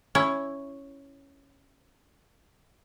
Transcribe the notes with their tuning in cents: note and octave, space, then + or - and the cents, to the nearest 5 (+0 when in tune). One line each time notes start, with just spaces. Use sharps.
C#4 +0 E4 +0